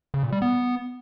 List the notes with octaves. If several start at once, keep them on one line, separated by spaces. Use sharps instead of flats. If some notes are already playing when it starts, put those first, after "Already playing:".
C#3
A#2
G3
B3